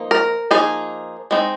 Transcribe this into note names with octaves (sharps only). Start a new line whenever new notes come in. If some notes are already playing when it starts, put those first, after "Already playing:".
Already playing: F3 A#3 D#4
A#4
F3 A#3 D#4 G#4
G#3 C4 D#4